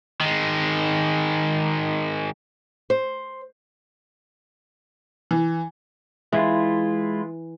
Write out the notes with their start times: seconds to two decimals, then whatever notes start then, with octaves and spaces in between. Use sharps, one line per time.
0.21 D#3 G#3
2.90 C5
5.31 E3
6.32 E3 G#3 E4 F4